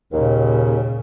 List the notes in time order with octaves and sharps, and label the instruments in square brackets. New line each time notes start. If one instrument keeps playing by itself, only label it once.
[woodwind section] D#2 [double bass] A#2 C#3